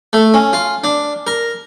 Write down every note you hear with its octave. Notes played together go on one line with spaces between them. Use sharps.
A3
C#4
F4
D4
A#4